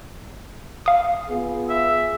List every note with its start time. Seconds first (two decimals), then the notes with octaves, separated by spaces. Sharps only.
0.86 F5 D#6
1.29 B3 F4 G#4
1.69 E5